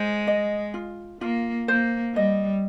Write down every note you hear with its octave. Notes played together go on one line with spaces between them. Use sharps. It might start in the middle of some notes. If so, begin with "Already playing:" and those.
Already playing: G#3 C5
D#5
F4
A#3 F4
A#3 C5
G3 D#5